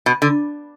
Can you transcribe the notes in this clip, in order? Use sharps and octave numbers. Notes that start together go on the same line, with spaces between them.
B2
D3